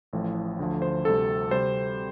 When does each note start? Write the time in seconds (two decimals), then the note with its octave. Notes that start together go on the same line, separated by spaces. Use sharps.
0.13 A1 A2 F3
0.59 D2 D3 F3
0.82 C5
1.05 D2 C3 G3 A4
1.51 C3 G3 C5